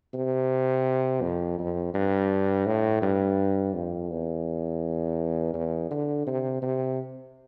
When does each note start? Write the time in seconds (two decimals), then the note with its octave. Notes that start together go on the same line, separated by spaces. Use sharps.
0.14 C3
1.22 F2
1.59 F2
1.94 G2
2.66 A2
3.02 G2
3.74 F2
4.10 E2
5.54 E2
5.90 D3
6.27 C3
6.62 C3